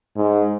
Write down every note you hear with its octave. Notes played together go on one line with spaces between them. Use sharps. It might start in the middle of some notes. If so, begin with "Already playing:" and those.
G#2